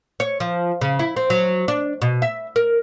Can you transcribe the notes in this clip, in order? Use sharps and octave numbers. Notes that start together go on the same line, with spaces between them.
C#5
F3
C#3
E4
C4
F#3
D4
B2
E5
A#4